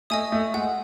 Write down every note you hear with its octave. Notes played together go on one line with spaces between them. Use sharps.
A3 D#5 G#5 D#6
A3
G#3 F#5